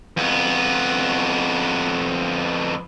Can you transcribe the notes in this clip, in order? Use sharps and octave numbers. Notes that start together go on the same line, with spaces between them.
F2 B3